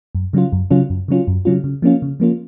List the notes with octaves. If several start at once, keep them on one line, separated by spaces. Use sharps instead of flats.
F#2
C#3 F#3 C#4 F4
F#2
C#3 F#3 C#4 F4
F#2
C#3 F#3 C#4 F4
F#2
C#3 F#3 C#4 F4
C#3
F3 A#3 C#4 F4
C#3
F3 A#3 C#4 F4